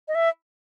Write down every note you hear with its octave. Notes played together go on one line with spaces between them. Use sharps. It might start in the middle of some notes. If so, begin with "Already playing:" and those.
D#5
E5